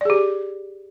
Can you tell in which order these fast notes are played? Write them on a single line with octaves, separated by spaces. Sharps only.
D5 G#4 G4